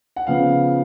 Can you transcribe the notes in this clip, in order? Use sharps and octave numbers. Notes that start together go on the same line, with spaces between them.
F#5
C#3 F3 B3 F5